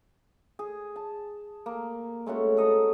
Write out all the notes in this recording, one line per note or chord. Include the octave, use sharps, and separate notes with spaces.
G#4
A5
A#3
G#3 A3 C#4 F#4
A4 D#5 A#5